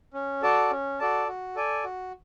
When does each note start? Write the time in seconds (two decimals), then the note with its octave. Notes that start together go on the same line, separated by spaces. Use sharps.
0.14 C#4
0.42 F#4 A4 D5 A5
0.71 C#4
0.99 F#4 A4 D5 A5
1.28 F#4
1.56 A4 D5 G#5
1.84 F#4